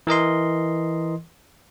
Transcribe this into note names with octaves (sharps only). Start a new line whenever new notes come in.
E3 A#4 D#5 C6